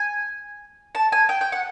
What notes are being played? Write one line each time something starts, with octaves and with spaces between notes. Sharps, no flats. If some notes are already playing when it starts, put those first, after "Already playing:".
Already playing: G#5
A5
G#5
G5
G5
F#5